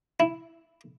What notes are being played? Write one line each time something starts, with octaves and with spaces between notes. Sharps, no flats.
E4